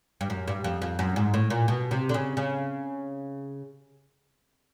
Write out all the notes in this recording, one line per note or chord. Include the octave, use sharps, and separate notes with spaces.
G2
F#2
G2
F2
F2
F#2
G#2
A2
A#2
B2
C3
D3
C#3
C#3